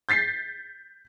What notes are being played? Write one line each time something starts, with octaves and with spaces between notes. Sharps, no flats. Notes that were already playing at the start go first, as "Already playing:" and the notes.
G6 A6 B6 C7